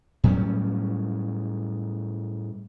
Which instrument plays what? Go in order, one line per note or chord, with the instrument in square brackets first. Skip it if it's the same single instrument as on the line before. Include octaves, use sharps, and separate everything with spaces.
[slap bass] A2 F#3 G3 C#4